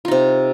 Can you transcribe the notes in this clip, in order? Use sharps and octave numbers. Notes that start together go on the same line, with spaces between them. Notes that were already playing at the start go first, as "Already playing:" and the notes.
C3 D#4 F4